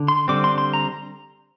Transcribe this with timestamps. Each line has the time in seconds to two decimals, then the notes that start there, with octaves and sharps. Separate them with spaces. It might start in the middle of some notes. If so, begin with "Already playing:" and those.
Already playing: D3
0.08 C6
0.28 D3 G3 C4 D6
0.44 C6
0.58 C6
0.73 A#5